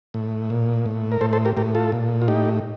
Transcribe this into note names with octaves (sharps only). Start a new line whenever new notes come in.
A2
A#2
A2
A#4
A2 A4 C5
A4 C5
G4 A#4
A2 G4 A#4
F4 A4
A#2
F4
A2 D#4 G4